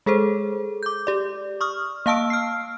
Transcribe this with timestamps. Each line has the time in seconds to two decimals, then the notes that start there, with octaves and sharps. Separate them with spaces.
0.06 G#3 G#4 A4 C5
0.83 D6 G6
1.07 G4 D5
1.61 C#6 D#6 F6
2.06 A#3 F5 A5 E6 D7
2.30 F6 C7